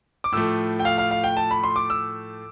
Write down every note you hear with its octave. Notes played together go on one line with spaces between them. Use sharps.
D6
A2 F3 A3 E6
G5
F5
F5
F5
G5
A5
B5
C6
D6
E6